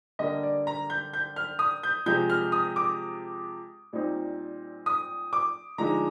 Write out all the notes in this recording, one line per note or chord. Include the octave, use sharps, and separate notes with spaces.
D3 G3 A#3 D4 D#5
D5
A#5
G6
G6
F6
D#6
G6
C3 F3 G#3 G6
F6
D#6
D6
A#2 G3 C4 D#4
D#6
D6
D3 F3 G#3 D#4 A#5